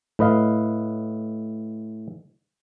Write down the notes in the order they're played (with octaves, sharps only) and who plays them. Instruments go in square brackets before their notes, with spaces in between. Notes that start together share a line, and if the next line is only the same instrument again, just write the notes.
[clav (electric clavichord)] A2 B4 D#5 F5